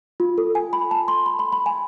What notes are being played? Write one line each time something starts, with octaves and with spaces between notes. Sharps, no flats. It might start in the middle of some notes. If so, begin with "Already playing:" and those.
F4
A4
G#5
B5
A5
C6
B5
B5
B5
G#5